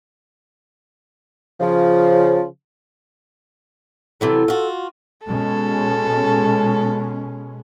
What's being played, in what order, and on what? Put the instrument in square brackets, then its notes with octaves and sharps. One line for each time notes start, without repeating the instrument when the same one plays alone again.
[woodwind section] C#3 F3
[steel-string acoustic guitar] C3 E3 F#3 [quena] A4
[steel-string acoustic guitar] F4 F#4
[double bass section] B2 G#3 C#4 [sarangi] A4